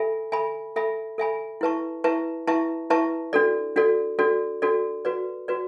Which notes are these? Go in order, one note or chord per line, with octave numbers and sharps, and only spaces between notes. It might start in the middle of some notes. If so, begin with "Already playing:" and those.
Already playing: A4 E5 G#5 B5
A4 E5 G#5 B5
A4 E5 G#5 B5
A4 E5 G#5 B5
E4 B4 E5 A5 C#6
E4 B4 E5 A5 C#6
E4 B4 E5 A5 C#6
E4 B4 E5 A5 C#6
D4 F#4 A4 D5
D4 F#4 A4 D5
D4 F#4 A4 D5
D4 F#4 A4 D5
F#4 B4 D5
F#4 B4 D5